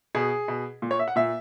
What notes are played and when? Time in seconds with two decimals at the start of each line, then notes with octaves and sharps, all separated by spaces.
0.15 B2 G#4
0.48 B2
0.82 A#2
0.91 C#5
0.99 E5
1.08 F#5
1.16 A#2 E5